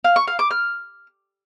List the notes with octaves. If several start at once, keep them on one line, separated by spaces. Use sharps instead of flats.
F5
C#6
F5
D6
F6